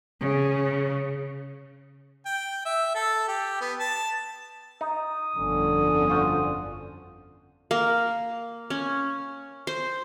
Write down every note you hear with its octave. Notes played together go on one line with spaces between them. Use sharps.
C#3
G5
E5
A4
G4
B3
A5
D#4 D#6
G1 F2 D3 C#4
F4 F#4 C5
A#3
C#4
C5